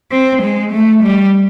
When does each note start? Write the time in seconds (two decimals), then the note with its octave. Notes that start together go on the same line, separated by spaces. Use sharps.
0.11 C4
0.42 G#3
0.72 A3
1.03 G3